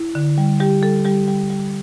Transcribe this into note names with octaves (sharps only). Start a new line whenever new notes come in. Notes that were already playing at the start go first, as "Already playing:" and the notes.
Already playing: E4
D3
G3
G3 G4
G3 A4
G3 G4
G3
G3